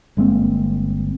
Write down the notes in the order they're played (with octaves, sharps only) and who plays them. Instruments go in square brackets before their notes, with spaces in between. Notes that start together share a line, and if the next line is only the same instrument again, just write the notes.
[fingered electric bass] G1 G#3 A#3 C4